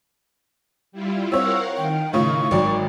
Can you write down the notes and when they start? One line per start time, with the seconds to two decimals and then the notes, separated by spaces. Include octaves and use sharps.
0.92 G3 E4 F4
1.32 C4 A#4 C#5 F5 F#5 E6
1.77 D#3 G5
2.13 A2 C#3 F4 C#6
2.51 G#1 D#3 F#3 D5